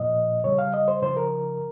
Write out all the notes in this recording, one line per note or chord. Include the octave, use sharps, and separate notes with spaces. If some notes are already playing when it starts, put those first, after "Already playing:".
Already playing: A#2 F3 D#5
C#3 G3 C#5
F5
D#5
C5
C#3 F3 C5
A#4